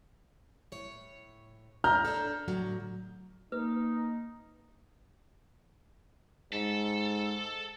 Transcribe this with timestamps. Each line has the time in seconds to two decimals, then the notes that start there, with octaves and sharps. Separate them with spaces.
0.72 A2 C#5
1.84 A2 F3 D4 A#5 F6 G6
2.05 D4 A4
2.48 A2 D3 F#3
3.52 A#3 D#4 B4
6.53 G#2 A4